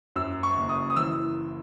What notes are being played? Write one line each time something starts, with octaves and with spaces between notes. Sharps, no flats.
F#2 E6
C#6
F#1
D#6
D#6
E3 E6